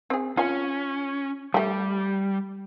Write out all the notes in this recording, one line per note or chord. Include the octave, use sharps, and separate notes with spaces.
C4 G#4
C#4 F4 G#5
G3 A3 G4